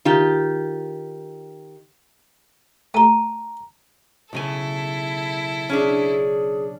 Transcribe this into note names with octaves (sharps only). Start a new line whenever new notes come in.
D#3 F4 G4
A3 G4 A5 A#5
B1 C#3 E4 A4 G#5
C#4 D4 G#4